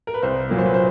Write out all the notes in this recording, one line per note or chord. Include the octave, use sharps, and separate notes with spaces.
A#4
B4
C2 C5
A#2 F#3 A#3
C5
B4
C5